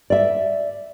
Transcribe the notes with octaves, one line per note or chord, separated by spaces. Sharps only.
D5 E5